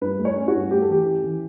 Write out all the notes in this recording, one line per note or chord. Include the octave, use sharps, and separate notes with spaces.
G2 B4
A3
C#5
C#4
F#4
G2
A3 G4
A4
E3 G4
C#4
E3